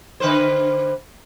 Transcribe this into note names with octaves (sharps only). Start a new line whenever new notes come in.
D3 B4 C5